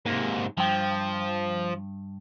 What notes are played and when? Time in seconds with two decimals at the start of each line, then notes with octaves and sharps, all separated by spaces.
0.06 G#2 C3 A#3
0.58 G2 F3 G5